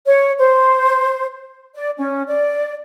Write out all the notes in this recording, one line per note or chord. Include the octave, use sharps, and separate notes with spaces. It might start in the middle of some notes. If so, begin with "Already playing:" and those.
C#5
C5
D5
C#4
D5